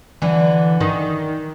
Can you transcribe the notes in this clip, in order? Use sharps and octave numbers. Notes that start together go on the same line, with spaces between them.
D3 E3
D#3